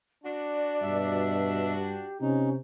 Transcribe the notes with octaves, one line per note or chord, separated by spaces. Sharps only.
D4 F#4 D5
G2 B2 E5
G4
C3 C#4 D#4